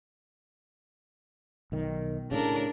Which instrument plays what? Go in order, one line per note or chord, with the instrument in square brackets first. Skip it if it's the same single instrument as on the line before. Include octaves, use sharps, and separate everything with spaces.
[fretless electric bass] B1 D#3
[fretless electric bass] A2 C#3 [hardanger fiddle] D4 A#4